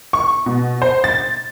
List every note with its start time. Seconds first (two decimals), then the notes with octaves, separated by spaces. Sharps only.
0.13 C#6
0.46 B2
0.82 C5
1.04 A6